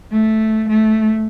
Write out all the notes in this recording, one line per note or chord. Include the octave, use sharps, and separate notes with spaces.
A3
A3